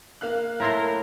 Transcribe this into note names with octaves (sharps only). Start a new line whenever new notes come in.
A#3 F5 F#6
A2 E4 A#4 E5 A5 C6